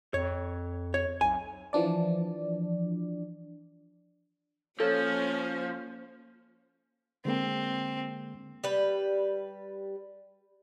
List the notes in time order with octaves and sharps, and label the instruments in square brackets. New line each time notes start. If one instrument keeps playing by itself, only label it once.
[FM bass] F2 [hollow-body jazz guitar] C#5
[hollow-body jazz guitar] C#5
[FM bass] B1 [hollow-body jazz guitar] G#5
[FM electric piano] E3 F3 D4 D5
[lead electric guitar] F3 [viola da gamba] A#3 C#4 [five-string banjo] A4 [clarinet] C#5
[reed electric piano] D3 G#3 A#3 [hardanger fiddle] C4
[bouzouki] G3 B4